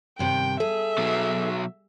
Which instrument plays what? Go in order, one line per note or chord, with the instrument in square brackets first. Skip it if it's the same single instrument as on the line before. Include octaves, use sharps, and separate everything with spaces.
[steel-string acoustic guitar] G2 C3 D#3 [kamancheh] G5
[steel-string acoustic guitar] G#4 [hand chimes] A4 [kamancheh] E5
[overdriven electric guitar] B2 F#3